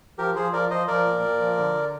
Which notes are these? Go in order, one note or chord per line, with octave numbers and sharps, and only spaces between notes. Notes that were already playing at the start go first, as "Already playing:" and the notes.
F3 G4 A#4
F3 G#4 C5
F3 A#4 D5
F3 C5 D#5
F3 A#4 D5
A#2
A#2
F3
D3